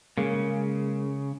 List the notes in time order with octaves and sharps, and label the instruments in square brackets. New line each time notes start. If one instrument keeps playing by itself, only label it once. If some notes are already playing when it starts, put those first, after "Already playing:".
[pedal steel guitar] C#3 [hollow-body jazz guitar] G#3 A#3